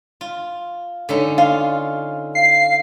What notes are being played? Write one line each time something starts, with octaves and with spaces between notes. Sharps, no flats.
F4
D3 C#4 D#4
F4 F5
F5 C7